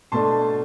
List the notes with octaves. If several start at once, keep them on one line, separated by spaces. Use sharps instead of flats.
B2 A3 D4 A5 C6